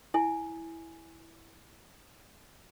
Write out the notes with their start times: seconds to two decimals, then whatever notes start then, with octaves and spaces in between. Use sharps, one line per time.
0.14 E4 G#5